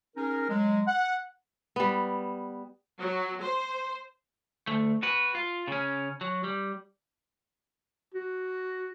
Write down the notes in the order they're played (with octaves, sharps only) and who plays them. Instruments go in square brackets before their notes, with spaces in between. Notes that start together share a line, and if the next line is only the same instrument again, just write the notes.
[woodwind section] C#4 D#4 G#4 A#4
F#3 G#3
F#5
[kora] G3 B3
[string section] F#3
C5
[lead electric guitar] D2 A3
F#4 B4
F4
C#3 C#4
F#3
G3
[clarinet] F#4